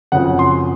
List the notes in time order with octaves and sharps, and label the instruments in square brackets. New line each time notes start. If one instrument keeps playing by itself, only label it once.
[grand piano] F#1 F#2 C#3 F3 C4 F#5
C6